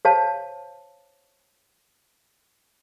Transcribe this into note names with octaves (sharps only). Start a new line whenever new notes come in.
C5 C#5 F5 A5